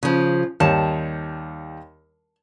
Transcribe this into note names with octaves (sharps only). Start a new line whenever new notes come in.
C#3 F3
D#2 G3 C#5 A5